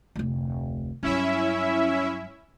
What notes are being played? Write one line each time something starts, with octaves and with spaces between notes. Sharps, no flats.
F1 D2
G2 F#3 C#4 E4 E5